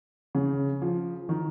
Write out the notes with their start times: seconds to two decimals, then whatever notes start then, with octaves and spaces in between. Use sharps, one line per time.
0.35 C#3
0.82 F3
1.29 D#3